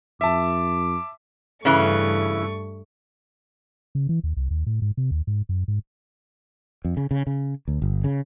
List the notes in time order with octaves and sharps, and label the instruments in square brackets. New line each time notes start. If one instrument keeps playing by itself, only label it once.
[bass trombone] F2 [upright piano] E5 A5 [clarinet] D6
[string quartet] G2 A3 C#6 [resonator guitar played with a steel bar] C#3 E3
[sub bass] C#3
E3
D#2
C2
D#2
A2
G#2
C3
D#2
G#2
F#2
G#2
[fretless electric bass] F2
C#3
C#3
C#3
D2
G1
C#3